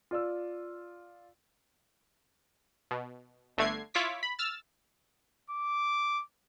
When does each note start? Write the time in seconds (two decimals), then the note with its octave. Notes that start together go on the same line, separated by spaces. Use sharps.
0.11 F4 D5 E6
2.91 B2
3.57 G1 D3 A3 G#6 C7
3.94 E4 F4 C#5 D6 B6
4.23 B5
4.39 E6 F6 A6
5.50 D6